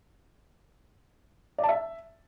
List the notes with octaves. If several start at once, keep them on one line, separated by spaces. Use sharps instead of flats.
D5
A5
E5